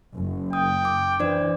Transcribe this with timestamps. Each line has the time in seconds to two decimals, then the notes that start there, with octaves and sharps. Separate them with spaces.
0.13 F#1
0.53 G5 D#6
0.85 D6
1.20 E3 D4 C5 D5